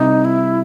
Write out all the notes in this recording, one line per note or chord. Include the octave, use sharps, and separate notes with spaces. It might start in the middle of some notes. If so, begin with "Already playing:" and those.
Already playing: C2 C3 D#4
E4